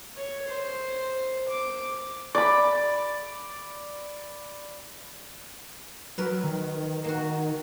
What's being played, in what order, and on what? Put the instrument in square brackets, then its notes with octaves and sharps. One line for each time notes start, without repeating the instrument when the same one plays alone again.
[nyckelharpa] C#5
C5
D6
[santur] D5 B5
[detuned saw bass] F#3 [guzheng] A#4 B4
[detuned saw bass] D#3
[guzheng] A#3 F#4